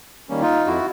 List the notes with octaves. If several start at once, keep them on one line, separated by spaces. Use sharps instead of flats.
D#3 G3 A#3 C#4
D#4 F4
F2 E4 F#4